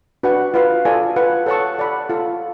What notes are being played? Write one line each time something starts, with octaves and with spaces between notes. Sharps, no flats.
D4 F#4 B4 F#5
F4 B4 F5
F4 A4 D5 G#5
F4 B4 F#5
A4 C#5 F#5 A5 C#6
A4 D5 F#5 B5
F4 A4 F5